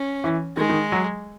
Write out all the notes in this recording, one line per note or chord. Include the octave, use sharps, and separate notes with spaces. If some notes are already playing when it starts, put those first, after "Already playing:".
Already playing: C#4
E3
D#3 G#3
D#3
F#3